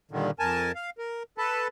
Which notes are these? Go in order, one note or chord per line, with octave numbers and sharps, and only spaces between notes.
G2 A#2 D3 D#3
F2 A#4 G#5 A5
F5
A#4
A4 B4 A5